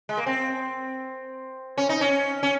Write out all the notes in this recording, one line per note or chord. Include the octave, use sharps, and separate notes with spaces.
G#3
A#3
C4
C#4
D#4
C#4
C#4